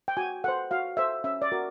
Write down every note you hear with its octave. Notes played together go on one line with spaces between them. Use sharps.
G5
F#4 G#5
A4 C5 F#5
F#4 F5
A4 C5 E5
C#4 E5
D5
F#4 A#4